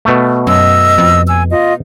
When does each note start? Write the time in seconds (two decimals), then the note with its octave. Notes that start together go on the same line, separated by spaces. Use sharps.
0.05 B2 A3
0.47 F#2 D#5 E6
0.98 F2
1.28 G#5 E6
1.50 F4 D#5